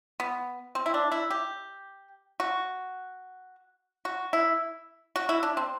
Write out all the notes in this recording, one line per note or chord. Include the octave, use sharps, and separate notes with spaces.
B3
C4
E4
D4
E4
G4
F#4
F#4
E4
F#4
E4
D4
C4